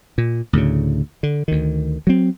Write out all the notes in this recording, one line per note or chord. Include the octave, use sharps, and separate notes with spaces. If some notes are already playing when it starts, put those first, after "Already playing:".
A#2
D2 A2 C#3
D3
D2 D#3
F#3 C4